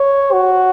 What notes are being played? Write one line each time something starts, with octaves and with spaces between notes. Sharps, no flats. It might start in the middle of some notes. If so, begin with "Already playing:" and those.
Already playing: C#5
F#4